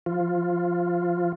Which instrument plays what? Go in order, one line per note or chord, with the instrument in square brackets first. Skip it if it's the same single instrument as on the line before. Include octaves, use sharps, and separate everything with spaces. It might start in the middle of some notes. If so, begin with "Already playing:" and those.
[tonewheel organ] F3 F4